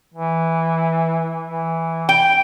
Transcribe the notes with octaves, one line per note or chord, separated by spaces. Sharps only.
E3
E3
G5